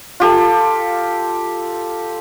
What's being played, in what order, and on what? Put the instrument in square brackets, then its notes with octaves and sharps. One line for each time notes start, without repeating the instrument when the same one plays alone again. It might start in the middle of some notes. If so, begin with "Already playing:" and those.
[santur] F4 G4 A4